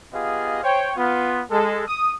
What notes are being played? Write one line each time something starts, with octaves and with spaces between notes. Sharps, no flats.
B3 F4 G4 G#4 D#5 F5
C5 C#5 G5
B3 F4
G#3 A4
D#6